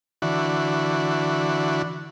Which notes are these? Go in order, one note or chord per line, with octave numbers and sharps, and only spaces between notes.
D3 E3 F#4